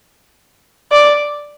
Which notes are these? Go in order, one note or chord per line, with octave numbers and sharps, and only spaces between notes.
D5